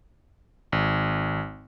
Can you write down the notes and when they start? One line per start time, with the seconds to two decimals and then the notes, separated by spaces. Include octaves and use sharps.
0.72 G#1